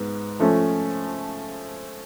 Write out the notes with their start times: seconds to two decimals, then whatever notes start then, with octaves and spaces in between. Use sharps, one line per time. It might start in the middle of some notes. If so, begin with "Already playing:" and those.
Already playing: G#2 B3
0.39 F3 A3 C#4